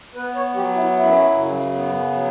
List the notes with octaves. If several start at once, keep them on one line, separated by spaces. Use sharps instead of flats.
B3 B4
C#5
F#3 G4
E4
F#2 E4
C#3
B3
F#3